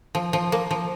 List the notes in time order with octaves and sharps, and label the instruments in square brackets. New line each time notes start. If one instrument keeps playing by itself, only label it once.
[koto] F3
F3
A#3
F3